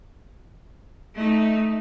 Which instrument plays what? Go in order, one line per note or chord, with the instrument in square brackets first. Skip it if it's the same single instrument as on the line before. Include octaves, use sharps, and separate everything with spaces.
[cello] A3 D#4